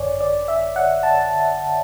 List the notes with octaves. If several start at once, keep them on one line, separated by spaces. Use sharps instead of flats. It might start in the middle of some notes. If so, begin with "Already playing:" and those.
Already playing: G#1 F#2 D3 C#5 D5 G#5
D5
E5
F#5
A5